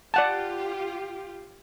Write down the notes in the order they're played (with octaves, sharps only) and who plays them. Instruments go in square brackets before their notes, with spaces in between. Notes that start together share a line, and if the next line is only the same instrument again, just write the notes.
[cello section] F4 G4 [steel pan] D5 F#5 A5